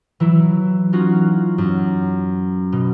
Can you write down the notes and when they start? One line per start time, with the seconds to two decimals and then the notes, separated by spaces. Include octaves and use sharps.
0.20 E3 F#3 E4
0.93 C#4 D#4 F4 F#4
1.58 F#2
2.72 B2